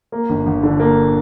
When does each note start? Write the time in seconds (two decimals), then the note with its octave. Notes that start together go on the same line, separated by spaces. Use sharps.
0.12 A#3
0.30 G1
0.46 G1
0.63 D3
0.80 A#3